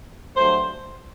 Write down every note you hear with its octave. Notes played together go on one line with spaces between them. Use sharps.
G2 F#3 A3 C5